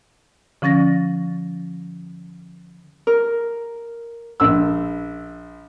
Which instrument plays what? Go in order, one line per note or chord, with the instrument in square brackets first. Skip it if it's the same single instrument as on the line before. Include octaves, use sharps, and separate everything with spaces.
[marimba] D3 F3 C#4 A6 A#6
[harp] A#4
[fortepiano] A#1 E6